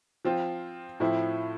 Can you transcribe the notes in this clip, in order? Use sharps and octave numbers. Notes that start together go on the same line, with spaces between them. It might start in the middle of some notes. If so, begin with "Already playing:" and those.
F3 C4 F4
A2 F3 C4 E4